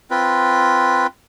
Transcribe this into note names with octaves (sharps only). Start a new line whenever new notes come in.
C4 F4 B4